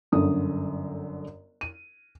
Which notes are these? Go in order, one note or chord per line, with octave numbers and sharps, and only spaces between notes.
G1 F#2 D3 D#6
D#7